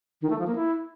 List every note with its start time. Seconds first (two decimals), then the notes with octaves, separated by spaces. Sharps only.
0.22 D#3
0.30 A3
0.38 F3
0.47 A#3
0.55 E4